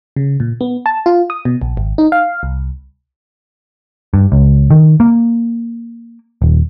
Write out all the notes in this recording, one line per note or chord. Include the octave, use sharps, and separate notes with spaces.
C#3
A#2
B3
A5
F4
D#6
B2
A#1
G#1
D#4
F5
C2
G2
C#2
D#3
A#3
D#1